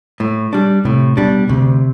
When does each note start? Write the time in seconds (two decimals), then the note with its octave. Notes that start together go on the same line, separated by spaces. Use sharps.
0.20 A2
0.53 G3 D4
0.85 A2 C3
1.17 B2 G3 D4
1.49 D2 C3